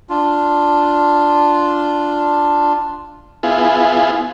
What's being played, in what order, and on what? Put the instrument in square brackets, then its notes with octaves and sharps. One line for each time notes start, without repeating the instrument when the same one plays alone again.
[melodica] D4 F4
[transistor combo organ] B3 E4 F4 G#4